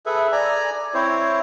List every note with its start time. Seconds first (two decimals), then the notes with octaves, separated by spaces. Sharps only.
0.06 G#4 A4 B4 E5
0.32 D5 G#5 A#5
0.94 C4 E4 C5 C#5